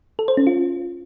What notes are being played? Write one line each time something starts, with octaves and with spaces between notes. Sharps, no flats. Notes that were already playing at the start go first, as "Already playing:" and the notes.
A4
C5
C#4
F4